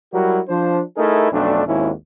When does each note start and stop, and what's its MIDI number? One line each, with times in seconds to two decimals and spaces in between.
0.13 0.40 54
0.13 0.40 55
0.13 0.40 64
0.13 0.40 66
0.13 0.40 67
0.13 0.40 70
0.49 0.81 53
0.49 0.81 62
0.49 0.81 72
0.97 1.30 57
0.97 1.30 63
0.97 1.30 64
0.97 1.30 68
0.97 1.30 70
1.31 1.65 35
1.31 1.65 41
1.31 1.65 57
1.31 1.65 61
1.31 1.65 62
1.67 1.91 32
1.67 1.91 39
1.67 1.91 44
1.67 1.91 61
1.67 1.91 64